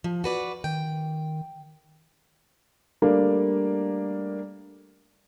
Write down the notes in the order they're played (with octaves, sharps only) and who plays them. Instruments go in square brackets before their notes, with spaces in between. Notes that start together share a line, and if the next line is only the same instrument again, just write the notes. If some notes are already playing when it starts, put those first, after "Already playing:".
[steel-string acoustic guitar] F3
F#4 B4 D5
[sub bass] D#3 [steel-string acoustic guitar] G5
[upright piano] G3 A3 A#3 D4